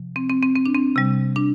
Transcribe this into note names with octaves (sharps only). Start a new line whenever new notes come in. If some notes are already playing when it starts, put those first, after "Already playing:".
Already playing: C3 F3
C4
C4
C4
C4
D4
C4
C3 G3
D4